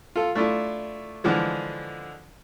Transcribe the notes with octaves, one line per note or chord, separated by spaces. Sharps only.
F4 A4
A3 D4 E4 F4
D3 E3 F3 G#3